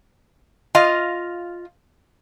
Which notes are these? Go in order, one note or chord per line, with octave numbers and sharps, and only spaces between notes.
F4 D#5 F5